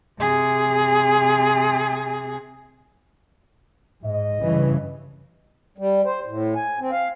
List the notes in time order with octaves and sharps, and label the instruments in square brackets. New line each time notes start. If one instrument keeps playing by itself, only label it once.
[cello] C3 G#4
[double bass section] G#2 [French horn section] D#5
[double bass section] G2 C#3 E3
[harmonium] G3
C5
A2
G#5
C4
F5